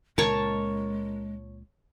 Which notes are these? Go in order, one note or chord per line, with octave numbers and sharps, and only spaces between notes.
C#2 A#2 C#3 G#3 A#4 C#5 A5